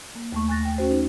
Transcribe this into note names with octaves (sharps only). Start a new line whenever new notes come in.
A#3
D#2 A3 C#6
G#5 C#6 F#6 A6 A#6
G5
C#4 F#4 C5
D#4